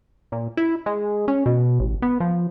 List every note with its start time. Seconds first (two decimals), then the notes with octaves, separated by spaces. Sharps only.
0.32 A#2
0.57 E4
0.86 G#3
1.28 C#4
1.46 B2
1.80 A1
2.02 B3
2.20 F3